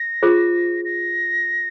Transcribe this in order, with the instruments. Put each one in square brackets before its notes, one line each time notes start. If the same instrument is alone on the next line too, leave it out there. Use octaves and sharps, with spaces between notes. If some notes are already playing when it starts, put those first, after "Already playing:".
Already playing: [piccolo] A#6
[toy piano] F4 G#4 C5
[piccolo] A#6